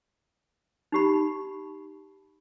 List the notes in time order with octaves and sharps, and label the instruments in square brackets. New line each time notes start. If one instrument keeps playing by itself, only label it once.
[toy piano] D#4 G4 B5